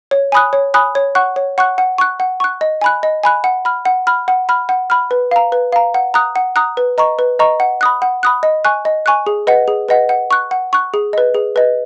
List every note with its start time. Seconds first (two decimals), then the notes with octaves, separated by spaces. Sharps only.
0.11 C#5
0.32 G#5 B5 D#6 F#6
0.53 C#5
0.74 G#5 B5 D#6 F#6
0.95 C#5
1.15 F#5 C#6 F#6
1.36 C#5
1.58 F#5 C#6 F#6
1.78 F#5
1.98 C#6 F#6
2.20 F#5
2.40 C#6 F#6
2.61 D#5
2.81 G#5 B5 F#6
3.03 D#5
3.23 G#5 B5 F#6
3.44 F#5
3.65 B5 F6
3.85 F#5
4.07 B5 F6
4.28 F#5
4.49 B5 F6
4.69 F#5
4.90 B5 F6
5.11 B4
5.31 F5 A#5
5.52 B4
5.72 F5 A#5
5.94 F#5
6.14 A#5 D#6 F#6
6.36 F#5
6.56 A#5 D#6 F#6
6.77 B4
6.98 D#5 A#5 C#6
7.19 B4
7.39 D#5 A#5 C#6
7.60 F#5
7.81 B5 D#6 F#6
8.02 F#5
8.23 B5 D#6 F#6
8.43 D#5
8.65 G#5 C#6 F#6
8.85 D#5
9.06 G#5 C#6 F#6
9.27 G#4
9.47 B4 D#5 F#5
9.68 G#4
9.88 B4 D#5 F#5
10.09 F#5
10.31 C#6 F#6
10.51 F#5
10.73 C#6 F#6
10.94 G#4
11.13 B4 D#5
11.34 G#4
11.56 B4 D#5